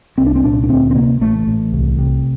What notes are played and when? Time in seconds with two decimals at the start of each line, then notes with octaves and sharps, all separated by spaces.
0.18 C2 C4
0.26 D4
0.35 C4
0.44 A#2 D4
0.64 D4
0.69 D2 C4
0.91 C4
0.95 C3 A#3
1.21 A1 A3
1.47 A1
1.73 C2
1.99 C3